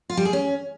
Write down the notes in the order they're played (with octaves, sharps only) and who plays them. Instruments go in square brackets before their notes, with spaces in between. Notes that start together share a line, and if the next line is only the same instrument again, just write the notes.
[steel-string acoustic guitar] F4
G3
G#4
C#4